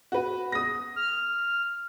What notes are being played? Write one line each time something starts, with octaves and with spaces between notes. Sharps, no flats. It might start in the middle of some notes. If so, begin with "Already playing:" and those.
F#4 B4
D#6 A#6
F6